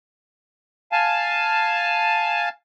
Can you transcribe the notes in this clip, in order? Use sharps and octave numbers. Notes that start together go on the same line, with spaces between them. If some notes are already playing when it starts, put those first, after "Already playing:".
F5 G#5 A5